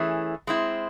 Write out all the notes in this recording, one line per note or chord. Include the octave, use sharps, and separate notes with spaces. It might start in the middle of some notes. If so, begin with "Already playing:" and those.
Already playing: E3 A3 C#4 E4 G#4
G#3 C4 E4